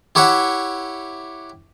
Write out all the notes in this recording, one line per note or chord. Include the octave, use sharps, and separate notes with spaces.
E4 G4 C#5 E5 F#5